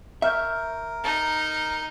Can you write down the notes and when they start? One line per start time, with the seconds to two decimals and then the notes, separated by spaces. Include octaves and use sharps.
0.22 A#4 E5 C#6 F6 G6
1.03 D#4